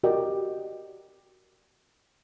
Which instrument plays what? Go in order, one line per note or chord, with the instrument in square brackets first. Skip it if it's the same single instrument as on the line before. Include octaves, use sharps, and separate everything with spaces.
[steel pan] F#4 G4 A#4 D5 D#5 G5